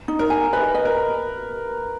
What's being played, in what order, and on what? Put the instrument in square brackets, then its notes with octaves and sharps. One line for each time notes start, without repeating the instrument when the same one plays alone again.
[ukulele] D#4
[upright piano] A#4
[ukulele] G#5
[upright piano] B4 [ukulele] D#5
[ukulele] D#5
[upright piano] A#4